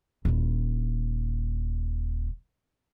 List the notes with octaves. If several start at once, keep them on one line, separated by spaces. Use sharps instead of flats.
D#1 E4